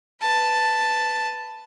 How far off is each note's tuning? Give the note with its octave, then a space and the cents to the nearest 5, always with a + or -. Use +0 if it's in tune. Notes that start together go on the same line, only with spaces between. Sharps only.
B4 +10 A5 +0